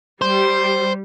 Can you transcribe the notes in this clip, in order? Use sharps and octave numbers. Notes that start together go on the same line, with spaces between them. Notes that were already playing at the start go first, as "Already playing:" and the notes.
G3 C5